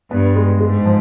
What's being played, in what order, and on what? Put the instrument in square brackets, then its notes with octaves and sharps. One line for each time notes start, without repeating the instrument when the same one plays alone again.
[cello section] G2 [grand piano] B3
[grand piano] G#3
[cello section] G#2 [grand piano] G#3
[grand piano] F3